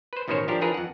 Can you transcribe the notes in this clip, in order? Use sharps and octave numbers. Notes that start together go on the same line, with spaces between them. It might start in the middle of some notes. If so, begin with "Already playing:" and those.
B4 C5
A1 B2 D#3 C#4 C5 C#5
F3 D4 G4 A#4
E3 F3 D4 G#4 A#4 B4
F2 F#5